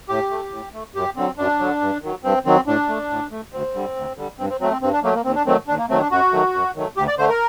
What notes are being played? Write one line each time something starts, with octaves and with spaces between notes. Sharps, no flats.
A2 G4
A3
A2
A3
F#2 G4
D3 F#3 C4
F#2 D4
D3 F#3
G2
D#3 F#3
G2 C4
D#3 F#3 C4
A2 D4
A3
A2
A3
D2 C4
D3 G3
D2
D3 G3
G2 C4
C4
F#3 A3 C4
C4
G2 C4
D4
F#3 A3 A#3
A#3
D#2 C4
D4
D#3 F#3 A3 C4
D#2 D4
A#3
D#3 F#3 A3 C4
D4
F#2 F#4
D#3 F#3 A3
F#2
D#3 F#3 A3
D2 G4
D5
D3 A3 C5
A#4